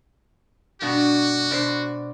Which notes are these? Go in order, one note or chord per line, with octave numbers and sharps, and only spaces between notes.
G2 B2 D4 F#4
B2 D4 C5